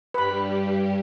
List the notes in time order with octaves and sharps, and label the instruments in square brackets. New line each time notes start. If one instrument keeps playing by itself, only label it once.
[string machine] G2 G3 G4 [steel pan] B4 B5